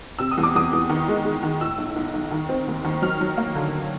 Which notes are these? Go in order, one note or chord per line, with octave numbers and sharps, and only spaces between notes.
C3 E6
D#6
E2
D6
E2 D#6
E2
D#3
G#3
G#3
D#3
A2 E6
B1
B1
B1
D#3
C4
D#2
D#3
F#3 F6
F#3
A#3
D3